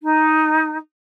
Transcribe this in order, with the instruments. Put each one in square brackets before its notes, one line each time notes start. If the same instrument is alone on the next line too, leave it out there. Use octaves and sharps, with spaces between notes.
[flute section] D#4